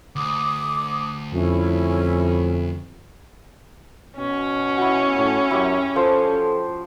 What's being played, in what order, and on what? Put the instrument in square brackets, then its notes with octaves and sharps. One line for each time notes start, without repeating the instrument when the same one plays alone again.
[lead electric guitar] D2 [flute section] D6 D#6
[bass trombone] F2 [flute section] C#4 E4
[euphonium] B2 [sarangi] C#4
[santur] E4 F#4
[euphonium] A2 [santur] B5
[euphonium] F#2 [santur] E4 G4 C#6
[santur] F3 C5 [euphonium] A4